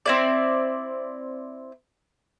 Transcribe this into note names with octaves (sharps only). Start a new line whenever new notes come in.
C4 E4 D5